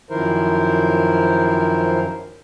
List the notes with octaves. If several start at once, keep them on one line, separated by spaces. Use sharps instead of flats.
F#2 D#3 F3 E4 A#4 C5